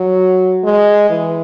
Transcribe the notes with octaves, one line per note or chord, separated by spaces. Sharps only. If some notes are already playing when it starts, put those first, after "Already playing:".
Already playing: F#3
G#3
E3